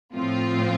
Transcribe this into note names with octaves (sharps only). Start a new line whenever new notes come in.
A2 F3 C4 F4